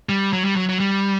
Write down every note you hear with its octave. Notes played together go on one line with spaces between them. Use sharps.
G3
F#3
G3
F#3
F#3
G3